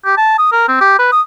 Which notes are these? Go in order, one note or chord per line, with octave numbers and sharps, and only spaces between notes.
G4
A5
D#6
A#4
C4
G4
B4
D#6